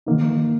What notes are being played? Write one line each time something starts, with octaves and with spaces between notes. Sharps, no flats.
D#3 A#3 D#4